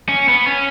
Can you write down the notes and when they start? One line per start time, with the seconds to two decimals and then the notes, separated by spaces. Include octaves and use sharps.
0.09 C#4
0.28 B3
0.47 C#4